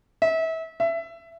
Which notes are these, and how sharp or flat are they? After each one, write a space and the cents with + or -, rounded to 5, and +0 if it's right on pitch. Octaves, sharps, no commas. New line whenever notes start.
E5 -30
E5 +15